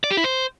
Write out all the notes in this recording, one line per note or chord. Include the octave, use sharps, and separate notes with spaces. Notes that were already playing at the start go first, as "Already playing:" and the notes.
D5
G4
E4
C5